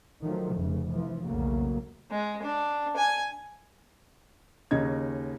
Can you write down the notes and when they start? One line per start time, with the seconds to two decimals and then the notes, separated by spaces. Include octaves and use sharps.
0.21 D#3 F3 F#3 A3
0.56 F1 F2 C#3
0.91 E3 F3
1.24 B1 E2 C#3 F#3 A3 A#3
2.11 G#3
2.43 D4
2.97 G#5
4.71 D#2 C#3 C#4 D#4 G#6